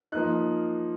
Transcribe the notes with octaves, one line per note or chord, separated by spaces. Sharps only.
F3 A#3 D#4 F#6